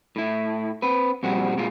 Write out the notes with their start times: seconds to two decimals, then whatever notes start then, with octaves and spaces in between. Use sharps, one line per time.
0.16 A2 E4
0.82 C4 B4
1.23 F2 A#2 G3 C4 F#4
1.57 A#2 G#3 F4